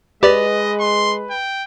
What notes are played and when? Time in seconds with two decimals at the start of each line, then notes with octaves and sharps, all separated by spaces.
0.23 G#3 G4 B4 D5 D#5
0.80 C6
1.30 G5